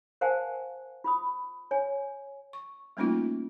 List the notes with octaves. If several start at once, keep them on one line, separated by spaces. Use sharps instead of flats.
A#4 C5 F5 F#5 G#5 A5
F4 B5 D#6
C#5 G#5
C#6
G3 A3 A#3 C#4 D#4 F4